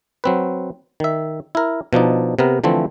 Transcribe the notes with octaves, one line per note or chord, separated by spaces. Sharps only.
F#3 C4 B4
D#3 E5
E4 A#4
B2 F3 D4 D#4
C3 B3 A#4
D3 E3 F3 A3 C4